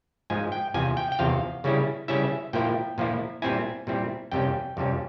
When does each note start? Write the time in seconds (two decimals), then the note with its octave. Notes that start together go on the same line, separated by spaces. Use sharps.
0.30 G#2 F3 G#3 G#5
0.52 G5
0.74 E2 C3 F3 G#5
0.97 G5
1.12 G5
1.19 E2 C3 F3 F5
1.64 C#3 G3 C#4 E4
2.08 C#3 G3 C#4 E4 E5
2.53 A#2 F3 A#3 E4 G5
2.98 A#2 F3 A#3 E4
3.42 A#2 G3 C4 E4 G#5
3.87 A#2 G3 C4 E4
4.32 F2 C3 G3 C#4 G5
4.77 F2 C3 G3 C#4